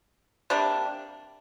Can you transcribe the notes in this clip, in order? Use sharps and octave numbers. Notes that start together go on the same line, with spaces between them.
C3 G3 A#3 D4